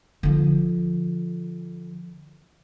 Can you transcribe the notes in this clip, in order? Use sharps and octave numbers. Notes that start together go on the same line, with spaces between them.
D3 F3